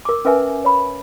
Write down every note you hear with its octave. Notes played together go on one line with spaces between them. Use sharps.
A#4 D6
C#4 A#4 B4 E5 G#5
C#5 B5